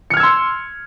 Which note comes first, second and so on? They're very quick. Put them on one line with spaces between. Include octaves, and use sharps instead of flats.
C#7 F6 G#6 E6 C6